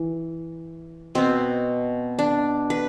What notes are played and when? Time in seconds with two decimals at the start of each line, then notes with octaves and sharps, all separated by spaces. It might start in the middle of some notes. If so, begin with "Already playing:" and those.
Already playing: E3
1.15 B2 B3 C4
2.19 D4
2.70 B4